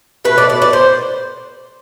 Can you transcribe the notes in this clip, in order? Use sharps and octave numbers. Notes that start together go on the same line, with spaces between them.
B2 A3 B4
D5
D5
D5
C5